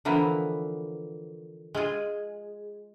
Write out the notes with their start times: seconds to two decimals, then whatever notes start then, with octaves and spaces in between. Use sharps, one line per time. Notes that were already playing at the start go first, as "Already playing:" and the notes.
0.05 D3 E3 F3 A#3 B3
1.75 G#3 F4 G#4